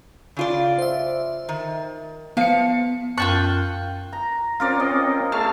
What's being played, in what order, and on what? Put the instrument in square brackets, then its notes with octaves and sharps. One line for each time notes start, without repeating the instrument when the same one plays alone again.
[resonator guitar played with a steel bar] C#3 F4 D5
[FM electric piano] C5 E5
[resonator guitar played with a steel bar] D#3
[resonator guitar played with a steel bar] F3 F5 [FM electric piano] B3 C#7
[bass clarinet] F#2 [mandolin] F4 G5 F#6 [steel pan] A5 C#6
[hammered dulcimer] A#5
[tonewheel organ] C4 C#4 [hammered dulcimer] F4 A#4 D5
[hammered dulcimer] D#5
[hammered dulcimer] A3 [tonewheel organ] G#4 A5 F6